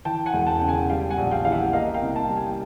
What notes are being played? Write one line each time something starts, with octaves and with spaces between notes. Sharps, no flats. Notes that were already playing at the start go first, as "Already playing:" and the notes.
E3 G5 A5
F#5 G#5
E1
G5 A5
C#3
F#5 G#5
G3 F5 G5
F#5 G#5
A#1
F5 G5
E3 F5
E5 F#5
A#3 D#5 F5
F5 G5
C2
G5 A5
G3
G#5
G5